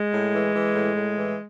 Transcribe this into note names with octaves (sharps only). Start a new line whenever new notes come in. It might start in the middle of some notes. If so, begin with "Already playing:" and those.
Already playing: G#3
A2
E3
E3
A2
A2
E3